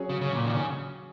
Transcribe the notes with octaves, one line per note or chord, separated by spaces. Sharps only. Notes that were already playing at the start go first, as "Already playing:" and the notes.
Already playing: F#3 C#4 G#4 C#5
C#3
C#3
A#2
D#3
C#3